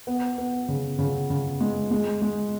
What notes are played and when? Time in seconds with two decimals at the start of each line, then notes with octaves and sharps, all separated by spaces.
0.07 B3
0.38 B3
0.69 C#3
0.99 C#3
1.30 C#3
1.61 G#3
1.91 G#3
2.22 G#3